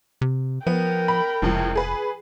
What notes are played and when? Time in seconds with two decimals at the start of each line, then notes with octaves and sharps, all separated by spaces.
0.21 C3
0.67 F3 B3 A#4 G5
1.08 B5
1.42 F1 C#2 A2 F3
1.75 G#4 B4